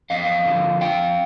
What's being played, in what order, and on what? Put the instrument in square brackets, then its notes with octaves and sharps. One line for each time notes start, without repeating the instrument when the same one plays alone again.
[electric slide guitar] F2 D#5 F5
D3 F3
F2 F5 G5